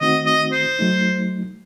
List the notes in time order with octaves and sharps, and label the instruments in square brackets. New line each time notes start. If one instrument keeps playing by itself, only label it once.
[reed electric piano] D#3 A3 C4 D#4 F#4 [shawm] D#5
[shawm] D#5
C5
[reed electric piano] F#3 A3 D#4